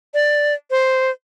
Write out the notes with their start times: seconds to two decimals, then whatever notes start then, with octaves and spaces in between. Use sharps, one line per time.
0.14 D5
0.71 C5